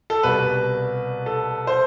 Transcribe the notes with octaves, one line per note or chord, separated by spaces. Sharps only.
A4
C2 B2 G3 B4
A4
C5